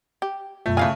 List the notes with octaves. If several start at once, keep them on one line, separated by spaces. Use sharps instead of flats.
G4
F#2 B2 A3 F4
C#3 E3 A3 F5 G#5